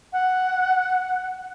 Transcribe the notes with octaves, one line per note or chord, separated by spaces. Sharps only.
F#5